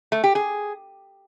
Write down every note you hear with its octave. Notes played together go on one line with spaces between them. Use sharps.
A3
G4
G#4